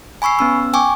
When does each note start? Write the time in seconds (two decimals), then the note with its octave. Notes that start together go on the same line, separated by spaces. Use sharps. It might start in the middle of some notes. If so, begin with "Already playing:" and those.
0.22 G#5 B5 C#6 E6 C7
0.39 B3 C#4 E6
0.73 G5 G#5 C#6 D6